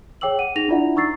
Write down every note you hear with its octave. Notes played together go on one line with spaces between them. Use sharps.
G#4 C#5 G5 D6 E6 F#7
F#5 D#7
D#4 G#4 A#6 F7
D4 E4 F4 D5 E5 F#5
D#4 A#5 C#6 E6 A6 C7